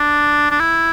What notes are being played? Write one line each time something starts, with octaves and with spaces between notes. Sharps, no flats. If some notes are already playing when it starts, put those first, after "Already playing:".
Already playing: D4
D4
E4